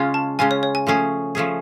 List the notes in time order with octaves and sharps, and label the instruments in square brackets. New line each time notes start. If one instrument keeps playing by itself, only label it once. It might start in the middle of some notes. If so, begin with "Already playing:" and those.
Already playing: [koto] C#3 G#3 C#4 F4
[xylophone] A5
[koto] C#3 G#3 C#4 F4 [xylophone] G#5
[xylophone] C#5
C#5
G#5
[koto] F3 A3 C#4 G#4
F3 A3 C#4 G#4